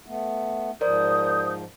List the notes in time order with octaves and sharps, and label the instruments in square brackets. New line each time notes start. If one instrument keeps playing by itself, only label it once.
[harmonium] A3 B3
[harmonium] G#2 F3 [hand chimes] A#4 C5 D5 [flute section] D#6 G6